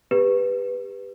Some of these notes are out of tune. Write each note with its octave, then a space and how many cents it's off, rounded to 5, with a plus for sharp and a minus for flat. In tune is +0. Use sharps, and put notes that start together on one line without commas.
G4 +25 B4 +0